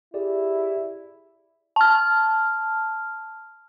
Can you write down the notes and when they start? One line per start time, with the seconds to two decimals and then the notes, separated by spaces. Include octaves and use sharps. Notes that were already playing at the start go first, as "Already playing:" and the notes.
0.14 E4 G4 G#4 D5
1.76 A5 F6